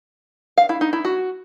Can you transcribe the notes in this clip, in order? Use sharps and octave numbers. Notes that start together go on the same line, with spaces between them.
F5
E4
D#4
E4
F#4